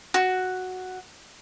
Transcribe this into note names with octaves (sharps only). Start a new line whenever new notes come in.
F#4